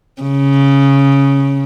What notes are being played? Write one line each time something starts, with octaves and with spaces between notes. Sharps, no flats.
C#3